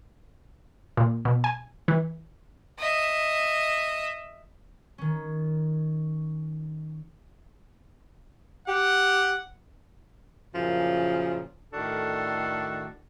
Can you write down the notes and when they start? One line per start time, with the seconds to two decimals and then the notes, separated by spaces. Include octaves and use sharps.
0.97 A#2
1.25 B2
1.44 G#5
1.88 E3
2.79 D#5 E5
4.98 D#3 C#4
8.68 G4 F#5
10.55 F#2 A#2 C#3 E3 F3
11.73 A2 D#3 D4 F#4 A4